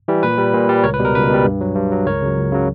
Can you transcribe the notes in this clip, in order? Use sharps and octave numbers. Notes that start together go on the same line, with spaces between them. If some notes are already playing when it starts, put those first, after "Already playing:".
E3 G3
A#2 B4
G3
A#2
G3
C#2 A#4 C#5
B4
B2 G3
A#4
C#2 B4
B2 G3
G2
F#3
G2
F#3
C#2 A#4 C#5
C#3 F#3
C#2
C#3 F#3